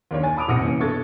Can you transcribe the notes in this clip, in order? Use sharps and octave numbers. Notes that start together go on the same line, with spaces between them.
D#2 D#3 D4 C#5
G#5 A6
A5 B5 D6 D#6 D7 F7
F1 C2 F#5 D#6 A#6 C#7
E3 A#3 C#4
G2 B2 A4 C#6 G#6 A6